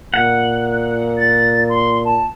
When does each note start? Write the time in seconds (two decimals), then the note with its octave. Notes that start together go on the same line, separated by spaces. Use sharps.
0.14 A#2 F#5
1.18 A6
1.69 C6
2.05 A5